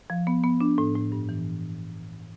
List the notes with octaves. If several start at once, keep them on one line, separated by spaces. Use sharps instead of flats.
F3
B3
B3
D4
A2
A2
G2
E3